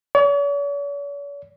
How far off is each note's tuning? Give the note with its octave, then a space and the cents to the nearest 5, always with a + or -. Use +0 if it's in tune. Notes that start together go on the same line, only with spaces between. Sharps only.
C#5 +45